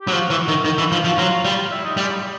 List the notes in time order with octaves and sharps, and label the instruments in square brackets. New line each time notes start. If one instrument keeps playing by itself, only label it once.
[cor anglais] G4
[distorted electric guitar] F#3
[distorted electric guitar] F3 [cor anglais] F#4
[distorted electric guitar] E3
[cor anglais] F#4
[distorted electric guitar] D#3
D#3
E3
F3
F3
[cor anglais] F#4
[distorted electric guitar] F#3 [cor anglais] F4
[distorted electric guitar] G3
[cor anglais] E4
D#4
[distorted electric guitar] G3
[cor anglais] G#3
G3